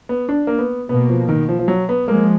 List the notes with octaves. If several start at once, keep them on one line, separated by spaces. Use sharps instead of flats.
B3
D4
A#3
B3
B2 A#3 B3
F3
D#3
F3
F3
F#3
B3
F3 G#3 A#3